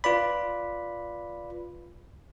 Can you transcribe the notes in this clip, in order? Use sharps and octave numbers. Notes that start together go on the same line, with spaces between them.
F4 B4 D5 B5